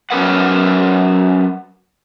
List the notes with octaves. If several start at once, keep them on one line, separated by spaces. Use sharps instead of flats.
F#3 C#4 A#4 B4 F#5